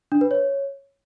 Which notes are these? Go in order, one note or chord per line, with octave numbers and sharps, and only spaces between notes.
D4
B4
C#5